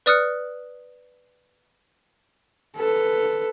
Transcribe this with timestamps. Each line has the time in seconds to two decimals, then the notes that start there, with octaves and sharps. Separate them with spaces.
0.06 B4 D5 D#6 F6 F#6 C#7
2.77 A4 B4